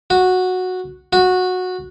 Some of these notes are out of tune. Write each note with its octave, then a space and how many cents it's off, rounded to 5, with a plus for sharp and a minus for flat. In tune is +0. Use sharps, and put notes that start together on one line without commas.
F#4 -10
F#4 -15